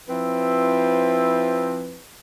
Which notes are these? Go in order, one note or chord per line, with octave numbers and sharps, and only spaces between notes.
F3 C4 E4 B4